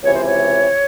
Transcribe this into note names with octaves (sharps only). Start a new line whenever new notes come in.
C#2 C3 E3 C#5
C5
C#5